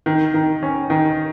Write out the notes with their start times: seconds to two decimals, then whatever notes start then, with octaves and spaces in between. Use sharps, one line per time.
0.06 D#3
0.34 D#3
0.63 C#4
0.90 D#3